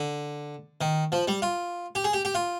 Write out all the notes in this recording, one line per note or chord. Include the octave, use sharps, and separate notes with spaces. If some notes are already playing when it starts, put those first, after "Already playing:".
Already playing: D3
D#3
F3
G3
F4
G4
G#4
G4
G4
F4